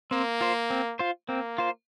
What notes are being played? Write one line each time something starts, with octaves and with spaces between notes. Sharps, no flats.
A#3 C4
F4 C5
C4
F4 C5
A#3 C4
F4 C5